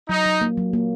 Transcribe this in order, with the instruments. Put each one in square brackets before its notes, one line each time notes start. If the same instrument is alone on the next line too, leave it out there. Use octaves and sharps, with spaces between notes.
[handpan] F#3 [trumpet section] D#4
[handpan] F#3
A#3
F#3
A#3